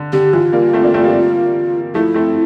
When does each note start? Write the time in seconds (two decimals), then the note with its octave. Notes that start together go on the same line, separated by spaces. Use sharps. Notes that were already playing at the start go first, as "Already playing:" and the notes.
Already playing: D3
0.13 D3 G4
0.33 E3 F4
0.53 G3 A#3
0.73 A3 C4
0.83 A#3 D4
0.94 A3 C4
1.03 G3 A#3
1.94 F3 A3 E4
2.14 A3 C4